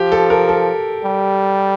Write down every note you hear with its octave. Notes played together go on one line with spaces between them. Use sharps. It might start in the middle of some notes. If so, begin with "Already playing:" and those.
Already playing: F3 G4
A4
A#4
A4
G3